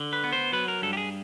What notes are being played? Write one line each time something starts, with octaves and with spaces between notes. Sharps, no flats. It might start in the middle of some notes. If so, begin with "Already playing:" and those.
Already playing: D3
B4
B3
C5
F#3 B4
A#4
G2 A4
G4
G#4